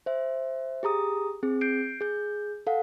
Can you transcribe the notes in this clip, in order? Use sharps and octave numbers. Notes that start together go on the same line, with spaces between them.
C5 E5
G4 G#4 A#5 D#6
C4 G#4
G6 C7 D7
G#4 G6
A4 F5 F#5